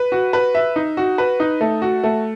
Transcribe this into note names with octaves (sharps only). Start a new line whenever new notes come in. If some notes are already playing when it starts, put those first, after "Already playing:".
Already playing: B4
F#4
B4
E5
D#4
F#4
B4
D#4
A3
F#4
A3